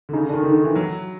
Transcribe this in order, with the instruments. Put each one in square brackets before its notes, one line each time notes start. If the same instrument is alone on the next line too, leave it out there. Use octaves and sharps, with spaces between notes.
[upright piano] D3
[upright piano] C#3 [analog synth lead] D#4
[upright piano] D3
[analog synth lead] D4
[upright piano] D#3
[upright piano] D3 [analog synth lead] D#4
[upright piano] D#3
E3
F#3